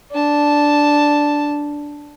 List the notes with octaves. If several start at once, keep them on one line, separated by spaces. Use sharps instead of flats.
D4 A5